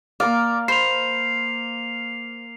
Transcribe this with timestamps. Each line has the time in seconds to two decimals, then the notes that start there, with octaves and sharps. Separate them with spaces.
0.20 A#3 A#4 D5 F5
0.68 C5 B5 C7 F7